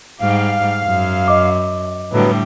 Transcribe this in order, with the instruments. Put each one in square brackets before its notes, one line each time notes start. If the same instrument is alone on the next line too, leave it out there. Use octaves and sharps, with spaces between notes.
[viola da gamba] G#2 G3 [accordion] F5
[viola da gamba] F#2
[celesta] D#5 D6
[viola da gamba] A2 D3 G3 [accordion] F#3 B3